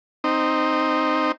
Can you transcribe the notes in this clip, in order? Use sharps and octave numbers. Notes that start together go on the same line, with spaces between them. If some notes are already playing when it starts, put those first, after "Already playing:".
C4 D#4